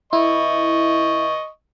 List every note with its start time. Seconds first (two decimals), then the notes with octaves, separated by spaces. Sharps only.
0.13 E4 D#5 C#6